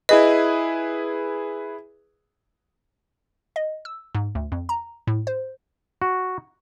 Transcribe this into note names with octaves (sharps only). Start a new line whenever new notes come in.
E4 G#4 B4 D#5
D#5
E6
G#2
D2
F2
A#5
A2
C5
F#4